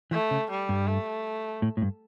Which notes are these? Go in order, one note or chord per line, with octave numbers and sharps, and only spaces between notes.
E3 A3
C#3
G3
G2
A3
A2
A2
G2